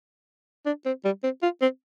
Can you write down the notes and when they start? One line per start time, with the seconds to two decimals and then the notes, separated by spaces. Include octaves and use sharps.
0.66 D4
0.86 C4
1.05 G3
1.23 C4
1.42 F4
1.61 C4